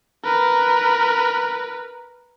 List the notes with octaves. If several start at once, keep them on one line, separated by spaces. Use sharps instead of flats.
A#4 B4